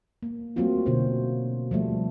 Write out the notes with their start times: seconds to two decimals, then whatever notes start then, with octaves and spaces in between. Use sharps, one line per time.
0.23 A#3
0.56 F#3 A3 A#3 C4 F4 F#4
0.86 B2 D3 C#4 F4 C5
1.71 F3 G3 A3